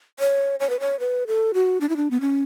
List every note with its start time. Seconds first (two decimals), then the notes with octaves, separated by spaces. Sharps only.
0.19 C#5
0.60 C#5
0.70 B4
0.80 C#5
1.00 B4
1.27 A4
1.54 F#4
1.81 D4
1.89 E4
1.97 D4
2.11 B3
2.21 C#4